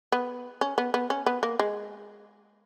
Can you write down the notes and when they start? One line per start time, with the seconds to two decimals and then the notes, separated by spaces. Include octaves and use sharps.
0.12 B3
0.61 C#4
0.78 B3
0.94 B3
1.10 C#4
1.26 B3
1.43 A#3
1.59 G#3